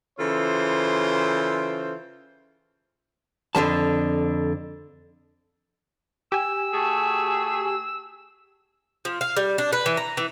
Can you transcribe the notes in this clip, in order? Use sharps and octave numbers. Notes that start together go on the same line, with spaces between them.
C#3 E3 F4 A4 C5
F2 D3 F3 A5
G4 G#5 E6
A3 F#4 G#4
F3
F5
G3
D4
B4
E3
A#5
E3